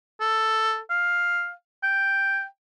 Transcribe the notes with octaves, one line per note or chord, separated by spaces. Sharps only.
A4
F5
G5